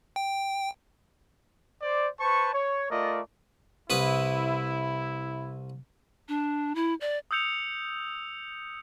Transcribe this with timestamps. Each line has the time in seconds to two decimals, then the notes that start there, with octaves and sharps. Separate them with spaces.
0.16 G5
1.82 C5 D5
2.20 B4 C5 A5 C#6
2.53 C#5
2.90 A3 F4 A#4 D5 D#5
3.90 C2 E4 B4 D#6
6.28 D4
6.75 E4
7.01 D5
7.31 D#6 E6 G6 C#7 F7